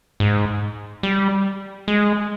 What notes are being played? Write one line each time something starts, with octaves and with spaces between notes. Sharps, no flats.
G#2
G3
G#3